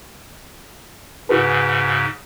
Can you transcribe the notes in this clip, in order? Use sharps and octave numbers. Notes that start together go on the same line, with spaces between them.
G#2 C#3 F#4 G#4 B4